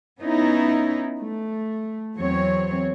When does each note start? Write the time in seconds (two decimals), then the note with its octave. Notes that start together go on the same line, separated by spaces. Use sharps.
0.20 B3 C#4 D#4 E4
1.19 A3
2.17 E2 F#3 C4 C#5